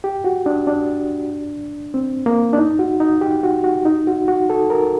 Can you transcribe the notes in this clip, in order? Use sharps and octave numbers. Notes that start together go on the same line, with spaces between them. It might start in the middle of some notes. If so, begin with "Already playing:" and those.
G4
F#4
D4
D4
C4
A#3
D4
D#4
F#4
D#4
G4
F#4
F#4
D#4
F#4
F#4
A4
A#4